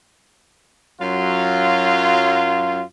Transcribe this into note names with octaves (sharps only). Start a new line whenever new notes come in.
F#2 F#3 F4